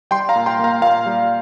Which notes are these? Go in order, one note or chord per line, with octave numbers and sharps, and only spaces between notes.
G3 G5 C6
F5 A#5
A#2
G5 C6
A#3 F5 A#5
A#2 F5 A#5
G3